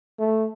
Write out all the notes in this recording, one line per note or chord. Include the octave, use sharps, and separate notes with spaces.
A3